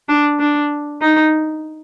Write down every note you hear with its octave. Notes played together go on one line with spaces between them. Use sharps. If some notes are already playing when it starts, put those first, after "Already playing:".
D4
D4
D#4